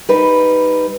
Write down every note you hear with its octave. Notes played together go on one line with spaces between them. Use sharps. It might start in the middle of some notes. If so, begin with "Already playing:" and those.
G3 D#4 B4